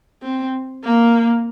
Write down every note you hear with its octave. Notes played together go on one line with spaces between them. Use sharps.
C4
A#3